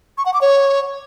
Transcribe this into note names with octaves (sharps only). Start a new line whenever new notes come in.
C#6
F#5
D6
C#5